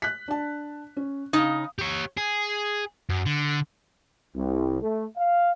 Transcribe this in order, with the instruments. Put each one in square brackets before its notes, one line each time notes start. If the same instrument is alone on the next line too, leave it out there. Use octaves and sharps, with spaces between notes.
[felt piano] F#6 B6
D4 A5
C#4
[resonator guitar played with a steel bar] C#3 D#4 [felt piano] F5 D#6
[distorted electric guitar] G4 C#5
G#4
F#2
D3
[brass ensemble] C2
A3
F5